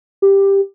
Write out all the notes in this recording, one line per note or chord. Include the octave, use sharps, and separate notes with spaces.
G4